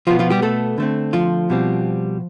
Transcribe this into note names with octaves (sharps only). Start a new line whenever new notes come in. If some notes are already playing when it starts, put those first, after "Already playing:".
B2 F3 B3 F4
F3 F4
G3 G4
A3 A4
D3 A3 C4
F3 F4
B2 G3 C4